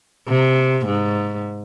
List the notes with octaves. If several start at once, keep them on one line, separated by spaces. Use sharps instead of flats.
C3
G#2